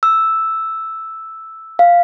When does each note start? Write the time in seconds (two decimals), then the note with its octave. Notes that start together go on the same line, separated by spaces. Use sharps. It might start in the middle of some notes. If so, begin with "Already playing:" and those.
0.03 E6
1.79 F5